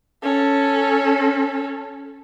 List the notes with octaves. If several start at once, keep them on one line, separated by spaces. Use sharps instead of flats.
C#4 A4